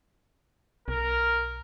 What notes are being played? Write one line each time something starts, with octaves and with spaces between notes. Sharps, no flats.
B1 A#4